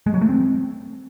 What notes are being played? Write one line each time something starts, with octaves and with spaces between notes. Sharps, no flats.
G#3
F#3
A3
C4